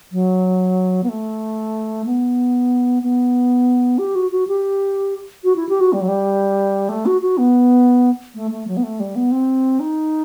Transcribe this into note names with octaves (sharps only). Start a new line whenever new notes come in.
F#3
B3
A3
B3
B3
G4
F#4
F#4
G4
F#4
E4
G4
F#4
G3
F#3
G3
A3
F#4
F#4
B3
A3
A3
F#3
B3
A3
G3
B3
C4
D#4